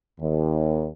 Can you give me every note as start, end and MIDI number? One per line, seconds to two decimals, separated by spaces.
0.19 0.89 39